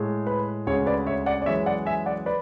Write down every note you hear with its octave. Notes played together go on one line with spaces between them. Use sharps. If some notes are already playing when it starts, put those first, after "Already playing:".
Already playing: A2 G#3
B4
D2 C#3 G#3 C#5
B4 D5
C#5 E5
D5 F#5
D5
F#2 E3 G#3 C#5 E5
D5 F#5
E5 G#5
D5 F#5
B4 D5